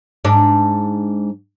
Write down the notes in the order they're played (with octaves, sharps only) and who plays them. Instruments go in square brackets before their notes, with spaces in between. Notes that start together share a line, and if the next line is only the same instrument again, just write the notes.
[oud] G#2 D4